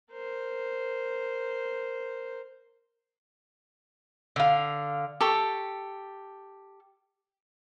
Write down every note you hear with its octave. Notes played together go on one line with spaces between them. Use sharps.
A#4 C5
D3 F5
G4 A4 C#6